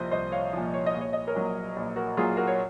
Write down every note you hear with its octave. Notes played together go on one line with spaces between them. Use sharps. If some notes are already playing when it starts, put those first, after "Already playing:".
Already playing: C2 A#2 F3 C5 D#5
C2 C5 D#5
C#5 F5
A#2 F3
C#5
D#5
A#1
C#5
D#5
A#4 C#5
A#2 F#3
A#1
F#4 A#4
A#2 F#3 F4 G#4
F#4 A#4
C#5